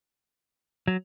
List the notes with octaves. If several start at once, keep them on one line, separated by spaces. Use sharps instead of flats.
F#3